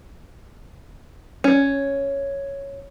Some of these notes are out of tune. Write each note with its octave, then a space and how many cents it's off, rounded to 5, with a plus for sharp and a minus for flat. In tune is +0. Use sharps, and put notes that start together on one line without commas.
C#4 +0